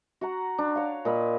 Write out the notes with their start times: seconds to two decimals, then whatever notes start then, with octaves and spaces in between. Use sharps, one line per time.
0.21 F#4 F#5 A#5
0.58 D4
0.75 C#5 F5
1.05 A#2 D#5 B5